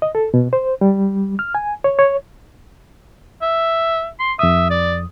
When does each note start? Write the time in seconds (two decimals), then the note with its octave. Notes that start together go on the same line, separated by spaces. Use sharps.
0.02 D#5
0.15 A4
0.34 B2
0.53 C5
0.81 G3
1.39 F6
1.55 G#5
1.84 C#5
1.99 C#5
3.42 E5
4.19 C6
4.39 F2 E5 D#6
4.71 D5